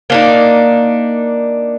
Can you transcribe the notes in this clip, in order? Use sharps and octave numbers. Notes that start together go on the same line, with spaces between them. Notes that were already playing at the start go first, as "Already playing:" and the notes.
A#3 D4 D#4